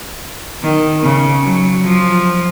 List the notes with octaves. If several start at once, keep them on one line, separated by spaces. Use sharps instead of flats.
D#3
C#3
F#3
F3